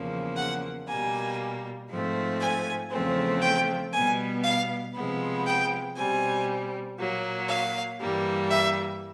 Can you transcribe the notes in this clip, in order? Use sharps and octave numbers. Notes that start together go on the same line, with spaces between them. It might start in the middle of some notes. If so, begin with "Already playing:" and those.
Already playing: E2 C#3 F3 A#3
F#5
B2 G3 A#3 G#5
G#2 F3 A3 C4
G#5
E2 C#3 F3 A3 C4
G5
B2 G3 B3 G#5
F5
C3 F3 G#3 B3
G5
B2 G3 C4 G#5
A#2 F#3 A#3
F5
G2 E3 G3 A#3
E5